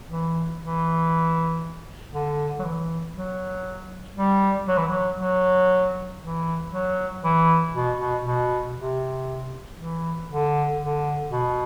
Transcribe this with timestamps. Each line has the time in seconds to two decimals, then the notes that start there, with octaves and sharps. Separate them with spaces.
0.09 E3
0.60 E3
2.13 D3
2.59 F#3
2.64 E3
3.15 F#3
4.16 G3
4.68 F#3
4.78 E3
4.88 F#3
5.19 F#3
6.21 E3
6.71 F#3
7.23 E3
7.73 B2
7.99 B2
8.24 B2
8.76 C3
9.77 E3
10.29 D3
10.80 D3
11.30 B2